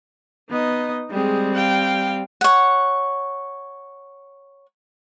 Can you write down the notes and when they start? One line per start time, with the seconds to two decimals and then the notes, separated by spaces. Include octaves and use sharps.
0.51 B3 D#4 D#5
1.10 G3 G#3 C4 G#4
1.54 F5 G5
2.41 C#5 F#5